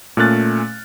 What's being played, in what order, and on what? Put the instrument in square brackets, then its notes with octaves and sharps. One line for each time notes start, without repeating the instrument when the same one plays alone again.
[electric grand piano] A#2 A3 C#4 F6 F#6 A6